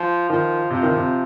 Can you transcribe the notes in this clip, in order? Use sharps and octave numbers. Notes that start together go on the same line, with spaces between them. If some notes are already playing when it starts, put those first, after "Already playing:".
Already playing: F3
D#3 F3
C3 F3
D#3
C3